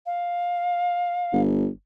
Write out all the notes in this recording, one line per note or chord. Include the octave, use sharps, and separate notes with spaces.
F5
G1